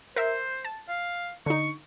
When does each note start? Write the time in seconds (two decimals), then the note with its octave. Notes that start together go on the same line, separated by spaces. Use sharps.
0.16 A#4 C5 E5
0.65 A5
0.89 F5
1.46 D3 D#4 C#6